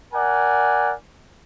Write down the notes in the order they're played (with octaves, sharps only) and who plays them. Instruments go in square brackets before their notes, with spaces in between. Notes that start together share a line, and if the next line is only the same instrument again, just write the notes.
[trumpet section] A#4 D5 F#5 G#5